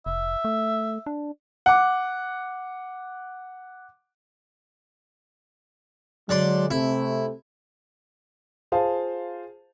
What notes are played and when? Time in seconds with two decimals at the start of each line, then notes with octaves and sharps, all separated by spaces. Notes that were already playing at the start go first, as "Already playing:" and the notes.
0.06 F1 E5
0.45 A3
1.06 D4
1.66 F#5 D6
6.29 D3 F#3 G#3 D5 C6
6.71 C3 A3 E4
8.72 F4 G#4 C5 F5 A5